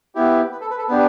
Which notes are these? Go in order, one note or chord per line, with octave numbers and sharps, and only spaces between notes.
B3 E4 G4
B4
A4
B4
A4
B3 D4 G4 B4